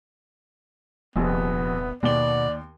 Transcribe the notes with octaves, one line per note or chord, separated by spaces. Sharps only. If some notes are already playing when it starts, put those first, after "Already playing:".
D#1 A#1 F2 C3 B3
D#2 B2 D5 G7